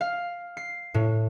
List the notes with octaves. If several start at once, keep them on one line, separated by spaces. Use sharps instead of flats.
F5
C7
A2